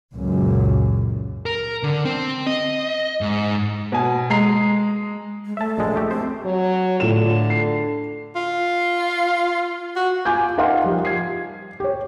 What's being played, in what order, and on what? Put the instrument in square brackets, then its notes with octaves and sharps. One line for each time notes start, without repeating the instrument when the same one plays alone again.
[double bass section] C#2 F#2 A#2
[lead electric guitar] A#4
D3
C4
D#5
G#2
[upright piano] B2 G#5
G#3 D#5 A#5 C7
[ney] G#3
[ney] A3 [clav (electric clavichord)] E5 A5
[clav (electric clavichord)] A#1 G#3
A3 G4
[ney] C4 [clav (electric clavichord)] C5
[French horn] F#3
[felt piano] A2 F4 E7 [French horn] D3
[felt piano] C7
[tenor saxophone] F4
F#4
[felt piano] F4 G#5 D6 G6
D#4 A#4 F5 F#5 C6
F3 G3
G#6 C7
G4 C#5